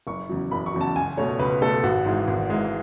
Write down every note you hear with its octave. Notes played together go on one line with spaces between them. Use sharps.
F#1 C#6
E2 C#3 F#3
F#1 B5
C#6
E2 C#3 F#3
A5
C#2 G#5
B2 A3 C#5
C#2 B4
B2 A3 A4
G#1 F#4
G#2 E3 G#3
G#1
G#2 E3 G#3